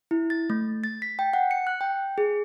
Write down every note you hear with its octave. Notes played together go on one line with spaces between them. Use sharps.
E4
A6
A3
A6
B6
G5
F#5
C#7
F#6
G5
G#4